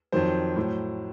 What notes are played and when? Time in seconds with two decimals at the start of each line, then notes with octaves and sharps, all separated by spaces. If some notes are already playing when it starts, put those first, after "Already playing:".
0.12 F2 D#3 F#3 C5
0.56 A2 F#3